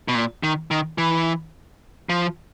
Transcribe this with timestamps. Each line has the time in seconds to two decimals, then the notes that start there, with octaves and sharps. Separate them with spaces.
0.08 B2
0.15 A#2
0.43 D#3
0.71 D#3
0.98 E3
2.09 F3